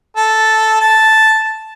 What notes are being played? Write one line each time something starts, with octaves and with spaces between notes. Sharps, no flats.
A4
A5